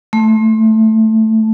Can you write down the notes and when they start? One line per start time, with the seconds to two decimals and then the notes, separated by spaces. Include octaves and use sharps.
0.13 A3